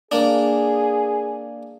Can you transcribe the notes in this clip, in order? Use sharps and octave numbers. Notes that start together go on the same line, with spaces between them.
A#3 D4 G#4